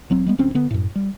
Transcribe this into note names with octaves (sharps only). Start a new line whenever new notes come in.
E1 F#3 C4
G3 G#3 B3
D1 D2 C4 C#4
D3 B3
F#2 A2
G3